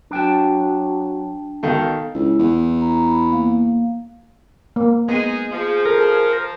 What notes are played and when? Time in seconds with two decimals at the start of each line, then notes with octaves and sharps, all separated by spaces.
0.11 F#3 D4 G5 A5
1.63 B2 D#3 A4 F5
2.15 C#2 E4
2.39 E2
2.81 A#5
3.07 B5
3.30 A#3 F5
4.76 A#3
5.09 G#3 B3 D#4 G#4
5.53 F3 G#4
5.85 A4 A#4